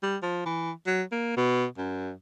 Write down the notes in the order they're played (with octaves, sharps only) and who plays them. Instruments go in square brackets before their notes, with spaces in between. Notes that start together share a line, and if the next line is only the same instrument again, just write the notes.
[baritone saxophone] G3
F3
E3
F#3
A#3
B2
F#2